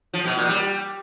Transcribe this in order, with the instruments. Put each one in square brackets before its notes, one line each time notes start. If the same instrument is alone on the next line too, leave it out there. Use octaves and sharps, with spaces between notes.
[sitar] F3
B2
A#2
G3